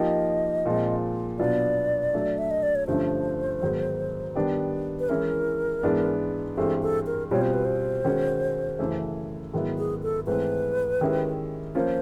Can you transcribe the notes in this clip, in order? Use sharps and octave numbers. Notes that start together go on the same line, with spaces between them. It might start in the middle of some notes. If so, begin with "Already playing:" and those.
Already playing: F3 A#3 D#4 G4 D#5
A#2 F3 G#3 C4
B2 F#3 B3 D4 F4 D5
F#3 A3 D4
E5
D#5
D5
C#5
G2 D3 F3 A3 C#4 C5
G#2 D#3 F#3 B3
D#3 G3 B3 D4 G4
B4
E3 G#3 C#4 E4 A#4
G#2 E3 G#3 B3 D4
G2 E3 G#3 C4 A4
A4
A#4
B2 G3 C4 F4 C#5
C5
B4
C5
D#3 G#3 C#4 F#4
F#2 C#3 E3 A3
G#2 D#3 F#3 B3 E4
G#4
A4
G#2 E3 A3 C4 B4
D#3 G#3 C#4 E4 G4
F3 A#3 C#4 F4 C5